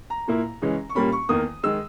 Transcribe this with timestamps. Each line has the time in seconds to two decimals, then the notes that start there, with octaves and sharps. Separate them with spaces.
0.10 A#5
0.28 A#2 A#3 E4
0.62 C#3 E3 G#3 C#4
0.90 C#6
0.95 A#2 G3 A#3 C#4 B5
1.12 C#6
1.29 E2 D#3 A#3 D#6
1.63 D#3 G#3 E6